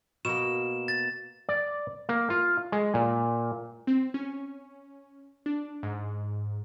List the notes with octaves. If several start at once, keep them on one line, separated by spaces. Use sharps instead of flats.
B2 A#3 E7
A6
D5
A#3
F4
G#3
A#2
C4
C#4
D4
G#2